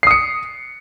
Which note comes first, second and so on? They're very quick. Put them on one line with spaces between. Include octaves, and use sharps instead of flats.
C7 D#6 C#7